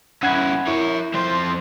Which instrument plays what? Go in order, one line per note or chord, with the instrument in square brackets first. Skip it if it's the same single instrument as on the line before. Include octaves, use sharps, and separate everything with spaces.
[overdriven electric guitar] C#3 E4 [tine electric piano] F#5 F#6 G#6
[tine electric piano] E4 [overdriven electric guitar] A#4 C#5
[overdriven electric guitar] F2 C5